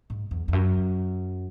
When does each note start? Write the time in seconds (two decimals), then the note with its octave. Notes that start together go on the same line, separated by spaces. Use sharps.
0.10 G#2
0.31 E2
0.48 E2
0.53 F#2